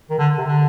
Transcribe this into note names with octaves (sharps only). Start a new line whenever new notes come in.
D#3
D3
C3
D3